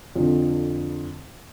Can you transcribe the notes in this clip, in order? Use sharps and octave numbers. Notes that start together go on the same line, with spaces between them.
F2 D3